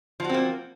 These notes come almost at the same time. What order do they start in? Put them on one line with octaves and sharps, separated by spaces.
F3 F#4 C4 A#3